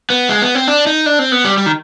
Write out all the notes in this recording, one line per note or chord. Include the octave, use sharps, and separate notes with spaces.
B3
G#3
B3
C4
D4
D#4
D4
C4
B3
G3
G3
D#3